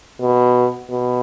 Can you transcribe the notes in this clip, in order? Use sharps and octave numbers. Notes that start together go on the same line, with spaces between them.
B2
B2